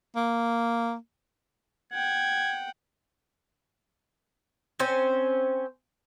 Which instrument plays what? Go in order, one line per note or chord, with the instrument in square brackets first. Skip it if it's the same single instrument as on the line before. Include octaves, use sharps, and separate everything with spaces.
[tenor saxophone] A#3
[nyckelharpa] F#5 G5 [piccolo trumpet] G#6
[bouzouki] C4 C#4 C5